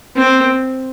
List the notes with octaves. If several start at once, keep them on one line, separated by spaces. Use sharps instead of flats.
C4